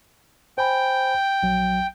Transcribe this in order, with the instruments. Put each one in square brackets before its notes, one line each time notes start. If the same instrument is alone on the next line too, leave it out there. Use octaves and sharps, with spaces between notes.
[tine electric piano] C5 G#5 B5 [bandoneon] G5
[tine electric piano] A#1 F#3